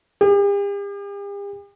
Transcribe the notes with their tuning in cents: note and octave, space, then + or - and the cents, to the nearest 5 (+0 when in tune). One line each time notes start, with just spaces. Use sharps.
G4 +45